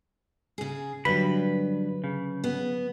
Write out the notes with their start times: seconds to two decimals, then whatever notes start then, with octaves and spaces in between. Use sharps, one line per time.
0.58 C#3 G#4
1.05 G2 D3 F#3 B4 B5
2.04 C#3
2.44 B3